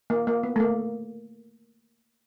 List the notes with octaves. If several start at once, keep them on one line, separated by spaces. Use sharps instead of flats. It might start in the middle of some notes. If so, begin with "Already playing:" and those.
A#3
A#3
B3
A3
A#3